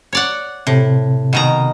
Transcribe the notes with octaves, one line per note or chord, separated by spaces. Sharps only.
C#5 D5 F#5
A2 C3
B2 D#3 A#5